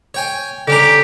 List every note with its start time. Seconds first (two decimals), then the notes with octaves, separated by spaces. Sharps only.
0.14 C#5 G5 G#5
0.68 D3 C#4 G4 A#5